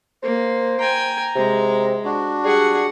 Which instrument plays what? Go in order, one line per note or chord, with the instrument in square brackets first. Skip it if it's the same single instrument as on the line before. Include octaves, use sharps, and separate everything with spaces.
[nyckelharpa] A#3 [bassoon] C5
[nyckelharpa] G5 G#5 [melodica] A#5
[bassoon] C3 [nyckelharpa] G#3
[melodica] D4 F#4
[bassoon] G3 [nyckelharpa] G#4 F#5